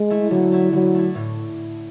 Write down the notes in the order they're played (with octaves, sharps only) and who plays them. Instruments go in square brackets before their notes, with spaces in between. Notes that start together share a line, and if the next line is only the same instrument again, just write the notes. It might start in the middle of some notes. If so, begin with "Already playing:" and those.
Already playing: [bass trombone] G#3
[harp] A3 E4
[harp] D3 [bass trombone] F#3
[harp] A3 E4
[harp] D3 [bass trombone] F#3
[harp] A3 E4
A2